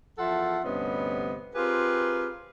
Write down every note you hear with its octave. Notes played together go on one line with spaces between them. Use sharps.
E2 F3 F4 A4 E5 F#5
D2 G2 C3 B3 C#4 D#5
C4 F4 G4 G#4 A#4 B4